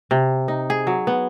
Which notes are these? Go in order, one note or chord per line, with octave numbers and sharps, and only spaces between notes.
C3
D#4
G#4
F#3
B3